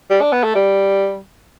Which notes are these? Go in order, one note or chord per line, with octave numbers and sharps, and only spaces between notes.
G3
D4
B3
A3
G3